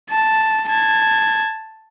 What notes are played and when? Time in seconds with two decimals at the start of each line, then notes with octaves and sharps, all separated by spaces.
0.10 A5
0.69 A5 G#6